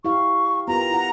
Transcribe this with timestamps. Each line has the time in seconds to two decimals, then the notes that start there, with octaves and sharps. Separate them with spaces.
0.05 E4 G4 F5 C#6
0.68 B3 F4 G4 A#4 A#5
0.90 E4 F#5